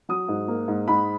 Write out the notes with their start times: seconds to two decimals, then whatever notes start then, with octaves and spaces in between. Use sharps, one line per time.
0.09 F#3 D#6
0.28 G#2
0.48 A#3
0.68 G#2
0.88 G#2 B5